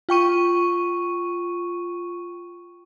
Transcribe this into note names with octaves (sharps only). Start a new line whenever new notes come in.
F4 G5 C#6 D#7